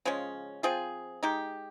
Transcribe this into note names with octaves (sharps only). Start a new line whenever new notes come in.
C#3 F3 G#3 C#4
F3 C4 F4 G#4
G#3 D#4 G4